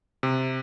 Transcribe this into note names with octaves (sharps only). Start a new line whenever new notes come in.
C3